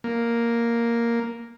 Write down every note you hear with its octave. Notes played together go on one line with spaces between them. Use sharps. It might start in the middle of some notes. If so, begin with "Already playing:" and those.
A#3